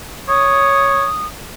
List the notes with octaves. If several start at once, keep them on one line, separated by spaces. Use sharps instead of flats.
C#5 D#6